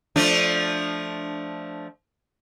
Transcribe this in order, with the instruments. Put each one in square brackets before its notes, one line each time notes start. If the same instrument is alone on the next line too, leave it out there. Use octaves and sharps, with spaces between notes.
[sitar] F3 A3 D4